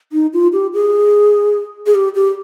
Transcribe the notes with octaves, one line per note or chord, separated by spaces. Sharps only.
D#4
F4
G4
G#4
G#4
G4
G4